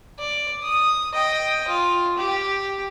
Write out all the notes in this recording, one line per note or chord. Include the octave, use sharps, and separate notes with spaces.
D5
D#6
D#5 G5
F4
G4